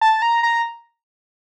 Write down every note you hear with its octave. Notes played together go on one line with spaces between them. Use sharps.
A5
A#5
A#5